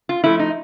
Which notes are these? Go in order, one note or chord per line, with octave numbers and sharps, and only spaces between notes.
F4
F3 A3 E4
D#4